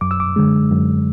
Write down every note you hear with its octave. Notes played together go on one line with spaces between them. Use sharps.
F#2 D6
E6
D6
D3 G#3
F#2